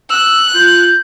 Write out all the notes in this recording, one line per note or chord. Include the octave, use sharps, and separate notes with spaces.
E6 F#6
F4 G6